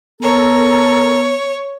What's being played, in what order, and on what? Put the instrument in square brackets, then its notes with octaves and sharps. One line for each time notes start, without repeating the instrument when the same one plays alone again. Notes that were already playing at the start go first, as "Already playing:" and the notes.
[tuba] B3 [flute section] A4 A#4 A#5 [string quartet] C#5